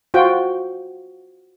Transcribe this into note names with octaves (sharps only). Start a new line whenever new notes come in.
F4 F#4 C5 G5